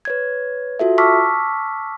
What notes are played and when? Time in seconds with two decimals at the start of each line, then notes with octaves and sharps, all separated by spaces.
0.05 B4 C#5 G#6
0.79 F4 F#4 A4 E5
0.98 A5 C#6 D6 E6 F6 B6